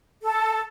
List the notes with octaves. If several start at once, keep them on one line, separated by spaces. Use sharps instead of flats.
A4